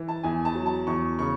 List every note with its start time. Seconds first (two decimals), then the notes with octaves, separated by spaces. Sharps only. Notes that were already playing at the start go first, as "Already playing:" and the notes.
Already playing: E3
0.08 A5
0.23 E2 G#5
0.45 A5
0.55 F#3
0.66 A5
0.87 E2 C#6
1.19 C#3 C#6